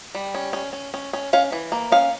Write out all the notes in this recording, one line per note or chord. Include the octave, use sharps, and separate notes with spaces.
G3
C#4
C#4
C#4
C#4
C#4
C#4 F5
E3
A#3
C#4 F5